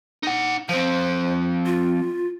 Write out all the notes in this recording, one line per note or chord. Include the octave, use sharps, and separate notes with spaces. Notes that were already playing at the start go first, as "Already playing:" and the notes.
D#4 F#5
F3 C4 C5
F4